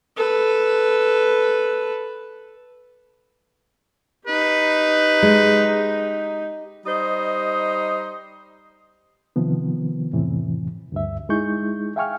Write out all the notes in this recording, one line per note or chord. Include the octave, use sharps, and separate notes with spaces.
A4 B4
D#4 G4 B4
G#3
G3 D#4 C5 D#5
C3 D#3 F3 B3
F2 A2 C3 E3
D2 G2 E5
G#3 D#4 E4 G#4 C#6 G6
E5 F5 G5 G#5 C#6 F6